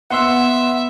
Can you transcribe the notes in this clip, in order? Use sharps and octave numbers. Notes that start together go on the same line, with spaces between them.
B3 E5 F#5 C6 E6